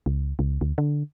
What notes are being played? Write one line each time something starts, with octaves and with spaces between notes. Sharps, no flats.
C#2
C#2
D2
D3